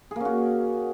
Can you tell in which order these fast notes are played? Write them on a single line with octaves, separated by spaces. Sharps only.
G#4 A#3 C#4 F#4